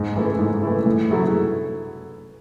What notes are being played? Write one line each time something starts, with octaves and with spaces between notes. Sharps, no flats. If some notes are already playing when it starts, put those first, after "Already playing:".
Already playing: G#2
E3 A3 E4
G#2
E3 A3 E4
A2
F#3 A3 E4 G#4